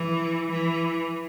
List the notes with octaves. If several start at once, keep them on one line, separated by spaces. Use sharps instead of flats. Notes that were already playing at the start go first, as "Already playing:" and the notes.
Already playing: E3
E3